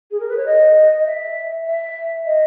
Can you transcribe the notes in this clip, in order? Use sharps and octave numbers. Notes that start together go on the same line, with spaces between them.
G#4
A#4
B4
C#5
D#5
D#5
E5
E5
D#5